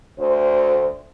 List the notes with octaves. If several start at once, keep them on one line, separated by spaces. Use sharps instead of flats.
D2 C5